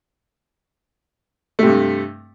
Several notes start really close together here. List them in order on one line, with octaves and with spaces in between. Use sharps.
A3 C3 G2